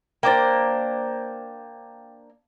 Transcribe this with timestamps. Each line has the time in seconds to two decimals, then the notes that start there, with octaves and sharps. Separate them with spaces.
0.23 A#3 D4 C5 G5 D6 A6